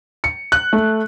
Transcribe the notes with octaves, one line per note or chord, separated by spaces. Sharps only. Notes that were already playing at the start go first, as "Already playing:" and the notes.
C#7
F#6
A3